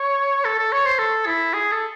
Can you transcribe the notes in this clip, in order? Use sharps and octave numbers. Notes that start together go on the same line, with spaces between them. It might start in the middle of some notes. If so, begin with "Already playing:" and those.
Already playing: C#5
A4
A4
C#5
C5
A4
E4
G#4
A4